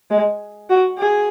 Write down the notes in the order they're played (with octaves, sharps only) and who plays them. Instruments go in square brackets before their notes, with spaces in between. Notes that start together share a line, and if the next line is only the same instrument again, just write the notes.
[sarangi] G#3
F#4
G#4